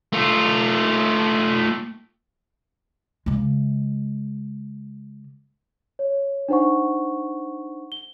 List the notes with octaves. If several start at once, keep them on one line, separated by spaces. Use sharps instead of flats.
A3 F4
C#3 G#3
C#5
D4 D#4 C5 F#5 C#6
G7